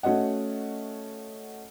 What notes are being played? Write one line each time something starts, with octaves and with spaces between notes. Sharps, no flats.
A3 C#4 F#4 D#5 F#5